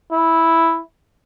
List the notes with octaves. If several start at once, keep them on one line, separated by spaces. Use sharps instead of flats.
E4